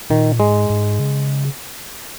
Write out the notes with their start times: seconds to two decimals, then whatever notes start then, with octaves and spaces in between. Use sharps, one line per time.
0.10 A#2 D#3
0.40 G#2 G#3
0.70 G#2
0.99 C#3